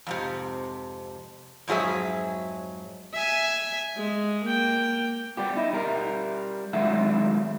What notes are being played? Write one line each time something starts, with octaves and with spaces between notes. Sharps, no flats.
F2 G#2 C3
F2 G#2 F#3 G#4 E5
E5 G#5
G#3
A#3 G5
G3 B3 G4
D#4 E4
G3 A#4
A2 D#3 F#3 G#3 E5 F#5